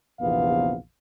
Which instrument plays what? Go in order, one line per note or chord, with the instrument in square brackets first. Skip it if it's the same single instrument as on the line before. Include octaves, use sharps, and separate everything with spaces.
[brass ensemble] A#1 E2 C3 B3 F5